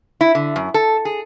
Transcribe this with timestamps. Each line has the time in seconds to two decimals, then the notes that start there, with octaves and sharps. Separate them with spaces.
0.21 E4
0.35 D3
0.56 F#2
0.74 A4
1.05 G#4